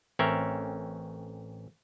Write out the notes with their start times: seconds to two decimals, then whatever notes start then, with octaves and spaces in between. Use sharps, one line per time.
0.19 A1 C4 C#4 A#4 C#5 E5